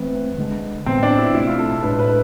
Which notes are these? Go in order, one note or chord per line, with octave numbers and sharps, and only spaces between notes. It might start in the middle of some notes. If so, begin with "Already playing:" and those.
Already playing: E3 A3 B3 C4
D3 G#3 D4
A2 E3 B3 C4
D4
E4
B2 A3 C4 E4
F4
A4
A4
A2 G#3 D4 B4
B4